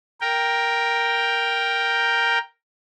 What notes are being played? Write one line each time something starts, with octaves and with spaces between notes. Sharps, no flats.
A#4 G5